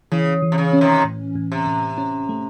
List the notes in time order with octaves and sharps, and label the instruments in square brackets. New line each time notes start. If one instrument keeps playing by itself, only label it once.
[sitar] C#3 [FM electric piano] E3
[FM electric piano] E3
[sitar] C3
C#3
[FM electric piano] C#4
[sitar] C3 D#3
[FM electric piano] A2
A2
[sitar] C3
[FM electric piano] A2
C#4
A3